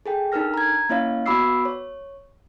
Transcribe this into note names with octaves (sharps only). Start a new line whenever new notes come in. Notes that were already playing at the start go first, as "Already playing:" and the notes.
G#4 A4 G5
D4 D#4 A4 A#4 F6 A#6
A#5 G#6
A#3 C#4 E4 C#5 D#5 F5
B3 F#4 B5 D6 E6 C7
C#5